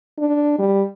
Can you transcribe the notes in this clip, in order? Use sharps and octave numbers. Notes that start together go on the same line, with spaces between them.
D4
G3